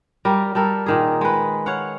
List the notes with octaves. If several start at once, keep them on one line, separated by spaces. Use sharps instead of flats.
G3 A#4
G3 A4 A#4
A#2 D#3 G#4
G#3 B4
C#5 F5 F#5